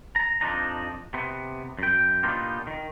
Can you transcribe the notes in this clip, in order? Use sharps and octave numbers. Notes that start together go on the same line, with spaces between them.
A#5
F2 F3 D4 D#4 A#5
C3 B3
F#2 G5
A#2 B3 D4 D#4 F4 G4
D#3